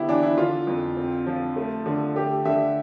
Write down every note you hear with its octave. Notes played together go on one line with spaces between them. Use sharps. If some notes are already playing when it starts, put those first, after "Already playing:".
Already playing: D3 B3 E4 G4
E3 D4
E4
D3 F4
F2
C4
F3
A3
D3
A3 G4
D3 E5